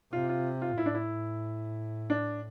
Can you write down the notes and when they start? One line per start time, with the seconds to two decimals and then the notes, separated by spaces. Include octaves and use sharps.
0.12 C3 F4
0.29 F4
0.62 F4
0.78 A2 E4
0.86 D4
0.95 E4
2.10 D4